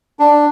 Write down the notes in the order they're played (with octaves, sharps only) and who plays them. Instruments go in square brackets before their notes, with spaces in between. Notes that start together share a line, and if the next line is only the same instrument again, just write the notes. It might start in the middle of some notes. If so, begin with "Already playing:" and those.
[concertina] D4